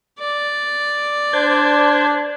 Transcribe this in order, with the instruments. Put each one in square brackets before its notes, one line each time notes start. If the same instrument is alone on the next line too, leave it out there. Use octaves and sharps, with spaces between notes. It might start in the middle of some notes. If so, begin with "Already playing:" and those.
[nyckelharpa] D5
[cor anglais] D4 [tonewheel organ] C5 G6 G#6